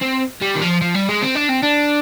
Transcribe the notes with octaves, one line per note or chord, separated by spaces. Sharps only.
C4
G3
D#3
F3
F3
G3
G#3
C4
D4
C4
D4